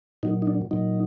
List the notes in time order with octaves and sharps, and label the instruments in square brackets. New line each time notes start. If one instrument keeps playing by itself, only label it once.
[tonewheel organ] A#2 F#3 D#4
D#4
D4
A#2 F#3 D#4